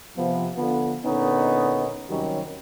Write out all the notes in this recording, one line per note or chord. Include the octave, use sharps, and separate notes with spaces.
C3 F3 B3
D3 F3 B3
A#2 D3 B3 C#4 D#4
D#2 C3 D#3 F#3 G3 C#4